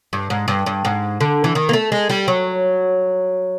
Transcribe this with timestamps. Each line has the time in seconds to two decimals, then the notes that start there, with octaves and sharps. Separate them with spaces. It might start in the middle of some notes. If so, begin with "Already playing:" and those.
0.13 G2
0.30 G#2
0.48 G2
0.66 G2
0.85 G#2
1.21 D3
1.44 E3
1.55 D#3
1.69 A#3
1.73 A3
1.92 G#3
2.10 G3
2.28 F#3